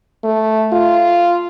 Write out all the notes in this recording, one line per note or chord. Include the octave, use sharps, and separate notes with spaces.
A3
F4